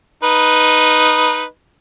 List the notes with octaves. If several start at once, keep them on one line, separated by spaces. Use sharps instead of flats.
D#4 B4